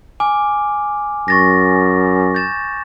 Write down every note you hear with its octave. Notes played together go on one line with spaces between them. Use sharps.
G#5 D6 F6
F#2 C#6 A6 A#6
G6 A6 E7